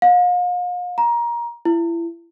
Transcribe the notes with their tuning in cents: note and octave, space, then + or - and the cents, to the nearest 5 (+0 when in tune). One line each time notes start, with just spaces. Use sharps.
F5 +40
A#5 +20
E4 +30